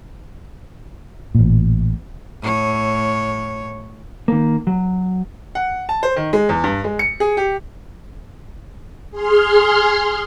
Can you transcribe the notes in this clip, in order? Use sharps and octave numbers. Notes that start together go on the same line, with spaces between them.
A1 A#2
A2 C#5
D#3 A#3
F#3
F#5
A5
C5
D#3
G#3
E2
G2
G#3
C#7
G#4
G4
G#4 C6 F6